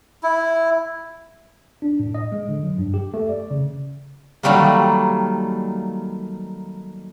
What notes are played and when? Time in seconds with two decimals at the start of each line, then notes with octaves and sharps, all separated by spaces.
0.23 E4
1.82 D4
2.00 A2
2.15 D#5
2.32 G#3
2.49 D3
2.63 F#3
2.78 G2
2.94 G4
3.14 A3
3.29 D5
3.51 C#3
4.43 D#3 F#3 G3 A3 A#3